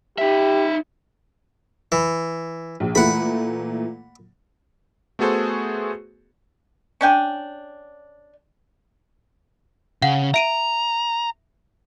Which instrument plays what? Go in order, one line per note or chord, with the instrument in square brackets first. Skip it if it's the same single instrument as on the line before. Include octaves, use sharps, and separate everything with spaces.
[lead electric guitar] D#4 E5 [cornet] G4
[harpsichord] E3
[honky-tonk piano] A#1
[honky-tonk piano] A#2 E3 A3 [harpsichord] F#5 B5
[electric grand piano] A3 B3 F#4 G#4 A4 C5
[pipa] C#4 D4 G5 G#5
[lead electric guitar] C#3 [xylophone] F5 F#5
[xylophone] E5 D7 D#7 [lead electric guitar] A#5